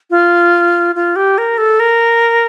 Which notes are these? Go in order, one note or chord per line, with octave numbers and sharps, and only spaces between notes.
F4
F4
G4
A#4
A4
A#4